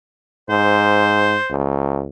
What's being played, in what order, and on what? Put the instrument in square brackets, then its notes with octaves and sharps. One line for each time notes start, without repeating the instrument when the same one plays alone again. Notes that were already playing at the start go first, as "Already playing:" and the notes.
[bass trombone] G#2 [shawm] C5
[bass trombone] C#2